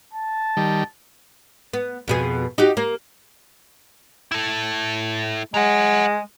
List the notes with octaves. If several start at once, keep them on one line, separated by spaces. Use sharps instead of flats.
A5
D#3 G3
B3
F2 B2 G#4
D#4 F#4 G4
A#3
E4 A4
F#3 G#3 F#5